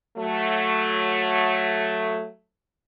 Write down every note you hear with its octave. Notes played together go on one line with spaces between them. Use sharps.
F#3 A3